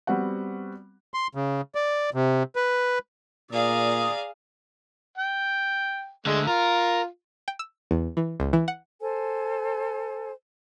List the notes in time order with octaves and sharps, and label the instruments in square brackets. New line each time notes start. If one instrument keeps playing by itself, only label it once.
[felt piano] G3 B3 C4 F#4 F#5
[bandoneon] C6
C#3
D5
C3
B4
[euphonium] A#2 [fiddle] G#4 F5 [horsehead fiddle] D5 A#5 [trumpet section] D#6
[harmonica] G5
[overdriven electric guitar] D2 D3 [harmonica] G#3
[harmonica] F4 [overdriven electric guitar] A#4
[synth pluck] G5
E6
E2
E3
C#2
E3
F#5
[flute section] A4 C5 G#5